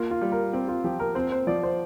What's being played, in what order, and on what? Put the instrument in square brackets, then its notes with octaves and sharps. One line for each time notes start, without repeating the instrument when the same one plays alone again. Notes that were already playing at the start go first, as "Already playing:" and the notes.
Already playing: [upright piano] A#3 [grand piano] F4
[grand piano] F4
[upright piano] G3
[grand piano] A#4
[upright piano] C4 [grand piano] G4
[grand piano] F4
[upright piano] F3 [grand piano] G4
[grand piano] A#4
[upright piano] C4 [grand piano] C5
[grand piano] C5
[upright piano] F3 [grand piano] D5
[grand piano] C5